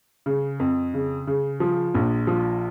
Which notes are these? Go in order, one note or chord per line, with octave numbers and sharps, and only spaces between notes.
C#3
F2
C#3
C#3
F3
A#1
F3